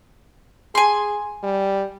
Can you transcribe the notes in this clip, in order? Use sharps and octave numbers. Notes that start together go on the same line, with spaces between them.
G#4 G#5 C6
G3